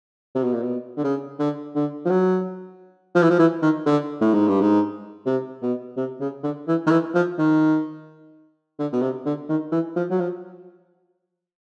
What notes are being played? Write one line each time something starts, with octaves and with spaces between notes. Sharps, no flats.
C3
B2
A#2
B2
D3
C#3
D3
D3
F3
F#3
F3
E3
F3
E3
D#3
D3
A2
G#2
G2
G#2
C3
B2
C3
C#3
D3
E3
D#3
E3
F3
D#3
D3
B2
C3
D3
D#3
E3
F3
F#3
F3